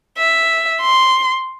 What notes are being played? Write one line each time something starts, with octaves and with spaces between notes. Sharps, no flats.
E5
C6